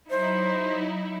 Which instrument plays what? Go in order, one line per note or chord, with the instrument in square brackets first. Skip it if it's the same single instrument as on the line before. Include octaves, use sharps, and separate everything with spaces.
[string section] F#3 D#4 E4 [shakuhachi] C5